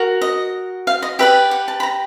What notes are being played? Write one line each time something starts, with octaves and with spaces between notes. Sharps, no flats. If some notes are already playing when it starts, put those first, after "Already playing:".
Already playing: F#4 A#4
D#5
F5
D#5
G4 B4 D5 E5
F#5
A5
B5
A#5